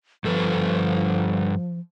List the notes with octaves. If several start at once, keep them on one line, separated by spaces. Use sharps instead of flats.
G2 F3 A4 B4